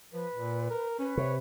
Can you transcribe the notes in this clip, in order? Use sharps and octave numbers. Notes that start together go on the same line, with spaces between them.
F3 B4
A#2
A#4
C#4 B4
C3 C#5